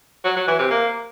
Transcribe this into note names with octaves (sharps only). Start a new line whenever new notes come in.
F#3
F#3
E3
C3
A#3